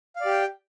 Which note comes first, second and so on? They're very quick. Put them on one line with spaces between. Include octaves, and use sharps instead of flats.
F5 D5 G4 G5